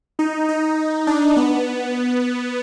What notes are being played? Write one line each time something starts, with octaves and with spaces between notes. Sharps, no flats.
D#4
D#4
D4
B3